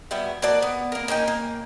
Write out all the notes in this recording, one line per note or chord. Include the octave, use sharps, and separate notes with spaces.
F#3 G3 B3 E5
A#3 F#4 D5 A5
B3
A#3 A#4
A#3 C#4 D#4 G5
A#3